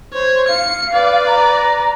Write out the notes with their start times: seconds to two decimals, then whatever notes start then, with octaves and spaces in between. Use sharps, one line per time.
0.13 C5 C#5
0.48 F5 C#7
0.93 B4 D5
1.27 A#5